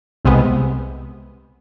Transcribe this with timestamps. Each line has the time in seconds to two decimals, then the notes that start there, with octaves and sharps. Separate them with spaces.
0.25 C2 C3 G#3 B3